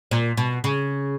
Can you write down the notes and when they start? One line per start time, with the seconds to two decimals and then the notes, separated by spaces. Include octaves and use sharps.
0.11 A#2
0.37 B2
0.64 C#3